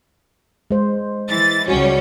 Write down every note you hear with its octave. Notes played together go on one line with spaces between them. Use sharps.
G#3 C5
E3 A6
C#2 G3 C#4 F#4